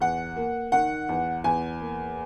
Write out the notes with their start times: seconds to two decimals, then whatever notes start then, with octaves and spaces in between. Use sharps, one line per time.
0.01 E2 F#5
0.36 A#3
0.72 D#3 F#5
1.09 E2
1.44 E2 G#5
1.81 A#3